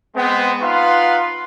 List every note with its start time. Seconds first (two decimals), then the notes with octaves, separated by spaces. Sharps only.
0.16 G#3 B3 C4
0.61 D#4 F4 B4 F5 F#5 C6